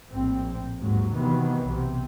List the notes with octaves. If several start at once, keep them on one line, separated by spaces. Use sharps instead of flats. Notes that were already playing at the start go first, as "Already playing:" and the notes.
A#1 A2 C4
A1 D#2 G#2 F#3
C3 D#3 E3 F#3 B3
B1 C3